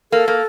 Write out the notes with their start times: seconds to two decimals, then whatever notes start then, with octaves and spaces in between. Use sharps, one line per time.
0.11 A#3 A4
0.28 A#3